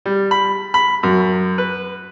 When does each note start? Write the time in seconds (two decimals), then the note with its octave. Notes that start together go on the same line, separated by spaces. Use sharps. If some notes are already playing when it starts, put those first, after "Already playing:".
0.06 G3
0.31 B5
0.74 B5
1.03 F#2
1.58 B4